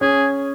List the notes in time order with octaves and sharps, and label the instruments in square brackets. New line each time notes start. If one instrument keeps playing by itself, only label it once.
[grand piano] C#4 [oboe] G#4